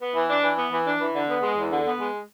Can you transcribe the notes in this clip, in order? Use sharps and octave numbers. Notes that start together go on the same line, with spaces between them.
B3
E3
D4
E3
B3
E3
D4
E3
D3
B3
G#3
E2
D3
B3
G#3